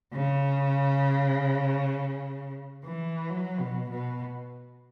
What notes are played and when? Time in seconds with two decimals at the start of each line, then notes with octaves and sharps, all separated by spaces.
0.13 C#3
2.84 E3
3.30 F#3
3.60 B2
3.90 B2